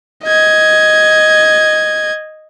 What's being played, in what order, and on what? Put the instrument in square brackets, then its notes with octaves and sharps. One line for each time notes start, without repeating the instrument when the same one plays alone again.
[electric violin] D#5 G#6